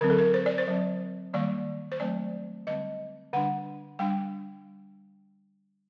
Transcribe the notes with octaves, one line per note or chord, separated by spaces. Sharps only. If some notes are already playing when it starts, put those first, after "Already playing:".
D3 F#3 C4 A#4
A4
A#4
C5
D5
C5
F#3 C4
D#3 G3 A#3 D5
C5
F#3 A3 C4 D5
D3 G3 C4 D#5
D3 G3 D4 F#5
G3 D4 G5